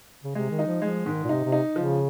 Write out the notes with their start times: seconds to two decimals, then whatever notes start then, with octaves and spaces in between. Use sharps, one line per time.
0.24 C#3
0.35 C3 G#3
0.51 D#3
0.59 D#4
0.66 F3
0.82 F3 G#3
1.06 G#2 D#3
1.24 A#2
1.29 C3 D#4
1.44 C3
1.52 D#4
1.76 C#3 F3